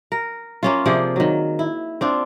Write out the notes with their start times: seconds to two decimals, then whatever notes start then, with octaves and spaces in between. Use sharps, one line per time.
0.12 A#4
0.63 A#3 C#4 F4
0.86 C3 F3 G#4 D5
1.16 D#3 F#3
1.59 E4
2.01 C4 D4 F4